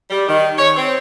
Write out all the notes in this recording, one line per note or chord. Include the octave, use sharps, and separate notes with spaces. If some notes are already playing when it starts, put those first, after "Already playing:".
G3
D#3
C#5
C4